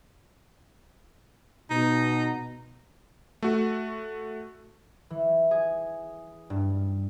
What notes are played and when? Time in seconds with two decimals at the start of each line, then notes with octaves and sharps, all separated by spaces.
1.70 B2 D#4
3.42 A3 F#4
5.10 E3
5.51 G#4
6.50 G2